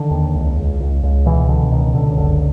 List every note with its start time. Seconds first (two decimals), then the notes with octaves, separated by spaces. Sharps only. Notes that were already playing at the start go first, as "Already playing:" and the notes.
Already playing: D3 D#3
0.11 D#2
0.35 C#2
0.57 C#2
0.80 C#2
1.03 C#2
1.26 B2 E3
1.49 B2 D3
1.72 C#2 D#3
1.95 C#2 D3
2.18 F#1 D3